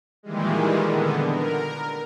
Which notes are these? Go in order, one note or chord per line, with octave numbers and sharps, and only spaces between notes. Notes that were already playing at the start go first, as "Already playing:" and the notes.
A#2 D#3 E3 G3 G#3
D3 B3
A#4